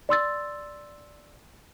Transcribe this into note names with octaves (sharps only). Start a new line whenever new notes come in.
D5 C6 E6 A6